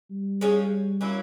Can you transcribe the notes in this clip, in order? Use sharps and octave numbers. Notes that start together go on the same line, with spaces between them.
G3
F3 G#3 C#4
F#3 A#3 C#4 E4